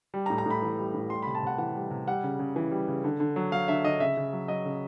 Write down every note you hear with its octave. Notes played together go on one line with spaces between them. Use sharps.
G3
A#5
A2
A#5
A2 B5
E3
G3
A2
G3 C6
B5
C3
A5
C3 F#5
E3 F#5
G3
C3
G3 F#5
C#3
C#3
E3
G3
C#3
D3
D3
F#3
F#3 F5
D3 E5
D3 D#5
C#3 E5
C#3
F#3
F#3 D#5
C#3